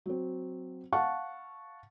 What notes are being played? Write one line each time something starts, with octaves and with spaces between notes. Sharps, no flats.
F#3 C4
F5 F#5 A5 C#6